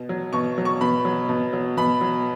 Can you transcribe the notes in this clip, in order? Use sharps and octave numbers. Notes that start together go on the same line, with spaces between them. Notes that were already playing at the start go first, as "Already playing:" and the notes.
Already playing: B2
F#3
B2 C#6
F#3
C#6
B2 B5
F#3
B2
F#3
B2 B5
F#3